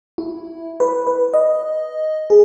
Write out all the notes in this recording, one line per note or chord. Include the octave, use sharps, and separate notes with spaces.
E4
B4
B4
D#5
G#4